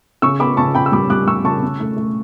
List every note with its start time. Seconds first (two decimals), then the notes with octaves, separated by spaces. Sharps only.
0.22 C#3 C#6 E6
0.40 B3 B5 D6
0.57 C#3 A5 C#6
0.75 C#3 G5 B5
0.86 E6
0.92 G3 B5 D6
1.10 G3 D6 F#6
1.27 G3 C#6 E6
1.44 C#3 A5 C#6
1.62 C#3
1.80 A3
1.97 A3